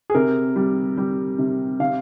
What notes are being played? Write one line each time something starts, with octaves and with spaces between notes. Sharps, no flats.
G#4
C3 A#4
G3
G3
C3
C3 F5